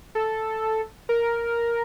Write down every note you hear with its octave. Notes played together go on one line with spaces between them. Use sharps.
A4
A#4